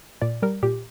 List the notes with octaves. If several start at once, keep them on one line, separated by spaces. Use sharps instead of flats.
A#2 D5
G3 A#4
A#2 G4